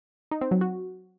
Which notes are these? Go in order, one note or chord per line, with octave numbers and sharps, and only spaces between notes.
D#4
C4
F#3
F#4